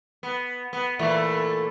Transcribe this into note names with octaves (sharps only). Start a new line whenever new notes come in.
B3
B3
A#2 E3 A3